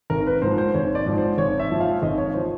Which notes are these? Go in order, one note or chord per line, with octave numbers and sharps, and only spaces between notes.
G#1 A#4
B4
G#2 F3 C5
C5
G#1 C#5
D5
G#2 F3
C5
G#1 C#5
E5
G#2 F3
F5
G#1 D#5
C#5
F3 C5